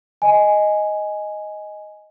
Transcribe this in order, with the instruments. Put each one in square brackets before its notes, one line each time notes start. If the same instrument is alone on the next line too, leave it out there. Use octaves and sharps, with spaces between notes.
[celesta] D#5 G#5